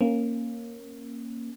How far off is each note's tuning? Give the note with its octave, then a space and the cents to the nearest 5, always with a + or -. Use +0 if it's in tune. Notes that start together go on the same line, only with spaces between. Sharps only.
A#3 +0 C#4 -20